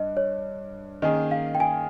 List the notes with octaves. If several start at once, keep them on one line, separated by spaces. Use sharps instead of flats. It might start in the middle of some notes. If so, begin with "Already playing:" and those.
Already playing: G2 D#5
C#5
D#3 A#3 C#4 G#4 D#5
F5
G5
G#5